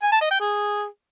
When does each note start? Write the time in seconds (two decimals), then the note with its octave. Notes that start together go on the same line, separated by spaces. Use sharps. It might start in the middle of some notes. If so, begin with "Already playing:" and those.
0.02 G#5
0.12 A5
0.21 D#5
0.31 G5
0.40 G#4